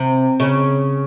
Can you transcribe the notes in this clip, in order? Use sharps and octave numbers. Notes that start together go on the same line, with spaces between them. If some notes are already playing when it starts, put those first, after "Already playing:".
Already playing: C3
C#3